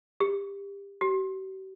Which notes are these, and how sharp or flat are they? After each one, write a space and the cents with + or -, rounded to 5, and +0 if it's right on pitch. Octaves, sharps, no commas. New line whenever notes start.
G4 +25
G4 -45